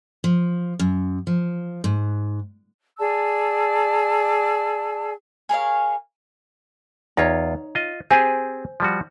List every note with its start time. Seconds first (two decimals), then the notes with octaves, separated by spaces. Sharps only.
0.24 F3
0.79 F#2
1.27 F3
1.84 G#2
2.99 G#4 D5 A5 E6
5.49 G#4 A#4 C#5 F5
7.17 E2 D#4 F4 C#5
7.75 F4 D#5
8.11 C4 G4 G#4 C5 G#5
8.80 F3 G3 F#4